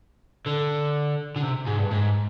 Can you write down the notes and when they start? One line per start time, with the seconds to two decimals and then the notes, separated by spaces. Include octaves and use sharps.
0.46 D3
1.36 D3
1.43 C3
1.67 G#2
1.79 G2
1.91 G#2